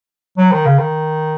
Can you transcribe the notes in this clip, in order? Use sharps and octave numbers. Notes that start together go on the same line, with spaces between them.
F#3
D#3
C#3
D#3